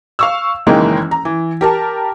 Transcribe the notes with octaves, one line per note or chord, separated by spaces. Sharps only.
F5 C#6 E6
F#1 D#3 E3 G#3 A#3 G5
A#5
E3
G4 A#4 A5